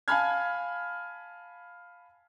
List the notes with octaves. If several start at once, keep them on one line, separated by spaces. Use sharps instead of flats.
F5 G#5 A5 B5 F6 G#6